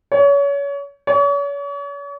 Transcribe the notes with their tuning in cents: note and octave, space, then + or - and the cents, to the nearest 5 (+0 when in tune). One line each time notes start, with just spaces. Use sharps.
C#5 +30
C#5 +40